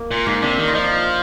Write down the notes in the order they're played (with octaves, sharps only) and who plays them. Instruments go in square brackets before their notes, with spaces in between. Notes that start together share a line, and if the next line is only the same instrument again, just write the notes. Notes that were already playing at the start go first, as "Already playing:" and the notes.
Already playing: [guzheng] A#3
[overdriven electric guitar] A#2
[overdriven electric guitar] G#2 [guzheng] A#3
[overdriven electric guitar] C3 [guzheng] D4
[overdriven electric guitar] D#3
[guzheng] F4
[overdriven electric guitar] F3 [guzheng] D#4